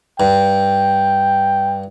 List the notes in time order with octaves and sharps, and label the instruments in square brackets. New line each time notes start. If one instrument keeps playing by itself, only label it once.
[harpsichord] G2 [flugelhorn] G5